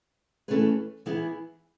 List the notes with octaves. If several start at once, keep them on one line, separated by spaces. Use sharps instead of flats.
E3 A3 C#4 G#4 B4
E3 B3 E4 G#4